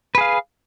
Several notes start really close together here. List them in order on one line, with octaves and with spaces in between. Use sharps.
B4 G#4 F5